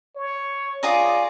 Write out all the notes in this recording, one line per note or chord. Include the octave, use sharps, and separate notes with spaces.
C#5
F4 G#4 D5 A#5